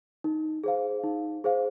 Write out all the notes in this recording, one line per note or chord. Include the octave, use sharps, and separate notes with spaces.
D#4
G#4 C5 F5
D#4
G#4 C5 F5